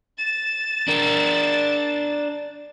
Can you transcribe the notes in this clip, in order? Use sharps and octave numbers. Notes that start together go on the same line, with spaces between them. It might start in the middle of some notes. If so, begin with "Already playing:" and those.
A6 E7
D4 A#4